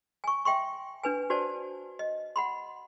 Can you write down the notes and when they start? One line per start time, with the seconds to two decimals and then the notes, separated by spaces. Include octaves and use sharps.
0.24 G#5 C#6
0.45 E5 G5 C6 C#6
1.03 D4 B4 G#5
1.30 F#4 C5 D5 A5
1.99 D#5
2.36 F#5 B5 C6